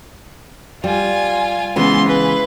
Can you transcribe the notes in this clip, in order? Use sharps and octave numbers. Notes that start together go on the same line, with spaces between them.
G3 F4 G#5
C#3 E3 G#3 B3 C6
B4